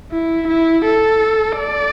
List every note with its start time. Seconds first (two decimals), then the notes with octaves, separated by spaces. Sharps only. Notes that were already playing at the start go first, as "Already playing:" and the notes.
0.11 E4
0.48 E4
0.85 A4
1.59 D5